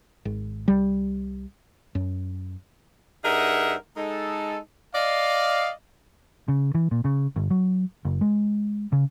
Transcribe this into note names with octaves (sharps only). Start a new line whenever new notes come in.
G#1
C2 G3
F#2
G2 D#4 G#4 A#4 E5 F#5
G#3 D#4 A4
D5 D#5 F5
C#3
E3
A#2
C#3
G1
F#3
F#1
G#3
C#3